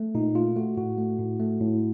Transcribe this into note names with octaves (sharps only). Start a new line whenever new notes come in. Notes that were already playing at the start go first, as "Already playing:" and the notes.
Already playing: A3
A#2 D#4
A3 F4
A3 F#4
A2 F#4
A3
A2
A3
A2